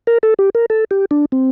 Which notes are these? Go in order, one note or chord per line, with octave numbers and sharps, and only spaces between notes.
A#4
A4
G4
A#4
A4
G4
D4
C4